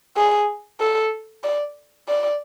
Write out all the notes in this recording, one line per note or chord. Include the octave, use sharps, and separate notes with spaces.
G#4
A4
D5
D5